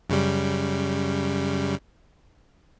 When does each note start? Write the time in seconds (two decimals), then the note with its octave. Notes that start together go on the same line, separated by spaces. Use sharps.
0.10 F#2 C#3 G3